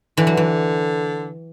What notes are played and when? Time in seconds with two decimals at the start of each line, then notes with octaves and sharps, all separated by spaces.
0.17 D3 E3
0.27 F#3
0.37 E3